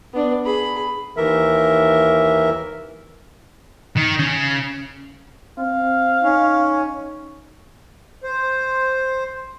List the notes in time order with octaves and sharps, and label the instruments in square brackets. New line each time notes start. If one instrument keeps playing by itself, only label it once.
[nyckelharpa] B3 D4
G#4 B5
[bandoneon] D#2 E3 A#4 E5
[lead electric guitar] D#3
C#3
[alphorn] C4 [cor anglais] F5
[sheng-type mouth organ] C#4 [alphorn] D#4
[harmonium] C5